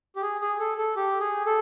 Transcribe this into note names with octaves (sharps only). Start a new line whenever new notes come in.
G4
G#4
G#4
A4
A4
G4
G#4
A4